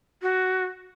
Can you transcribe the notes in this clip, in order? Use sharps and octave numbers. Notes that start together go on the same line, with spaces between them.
F#4